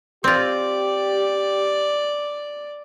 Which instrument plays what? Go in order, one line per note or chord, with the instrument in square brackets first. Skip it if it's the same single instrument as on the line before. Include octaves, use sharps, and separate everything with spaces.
[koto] C4 F4 [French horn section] G4 [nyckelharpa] D5